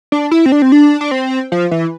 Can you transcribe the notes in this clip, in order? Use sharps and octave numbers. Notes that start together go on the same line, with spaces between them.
D4
E4
C4
D4
C4
D4
D4
C4
F3
E3